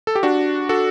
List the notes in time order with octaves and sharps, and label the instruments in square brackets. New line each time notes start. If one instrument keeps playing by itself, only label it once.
[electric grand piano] A4
G4
D4 F#4
F#4 A4